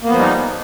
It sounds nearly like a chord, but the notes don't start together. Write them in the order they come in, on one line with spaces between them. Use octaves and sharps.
A#3 B3 F3 G3 D#4